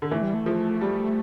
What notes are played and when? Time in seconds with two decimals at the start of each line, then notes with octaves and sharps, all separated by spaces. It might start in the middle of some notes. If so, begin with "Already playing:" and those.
0.02 D3
0.11 E3 A3
0.23 G3
0.34 A3
0.46 F3
0.81 G3